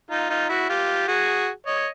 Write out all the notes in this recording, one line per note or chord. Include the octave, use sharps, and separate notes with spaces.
D#4 F4
D#4 F4
E4 F#4
F4 G4
F#4 G#4
C#5 D#5